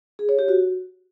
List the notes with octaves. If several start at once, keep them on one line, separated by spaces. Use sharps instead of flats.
G#4
C#5
G4
F#4